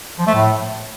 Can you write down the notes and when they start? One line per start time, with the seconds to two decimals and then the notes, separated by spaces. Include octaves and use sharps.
0.19 F3
0.27 A3
0.35 A2